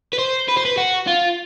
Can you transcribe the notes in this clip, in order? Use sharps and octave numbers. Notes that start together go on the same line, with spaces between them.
B4
C5
B4
C5
B4
F#4
F4